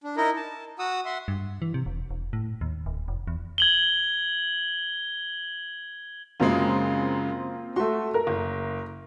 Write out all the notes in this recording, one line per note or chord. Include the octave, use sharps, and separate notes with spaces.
D4
D#4 E4 A#4 D#5
A5
F#4 F#5 D#6 E6
E5 F#5 C6
G2
E3
C3
E1
E1
A2
D#2
D1
F1
E2
G#6 F#7 G7
F#2 C#3 G#3 A#3 C4 F4
A3 F#4 E5 C6
A#4
F#1